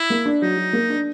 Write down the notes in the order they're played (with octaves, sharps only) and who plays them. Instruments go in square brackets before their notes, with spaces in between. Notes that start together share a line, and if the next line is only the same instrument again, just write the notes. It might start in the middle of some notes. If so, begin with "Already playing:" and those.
Already playing: [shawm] E4
[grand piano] A#3
D4
[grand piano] F#3 [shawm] D#4
[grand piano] F#3
A#3
D4